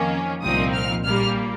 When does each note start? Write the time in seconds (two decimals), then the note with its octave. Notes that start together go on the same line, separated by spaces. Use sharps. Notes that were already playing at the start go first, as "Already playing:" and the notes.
Already playing: F2 D#3 A#3 C#4
0.42 C2 A#2 F3 C4 D#4 D#6
0.73 F6
1.04 A#1 A#2 G3 A#3 F6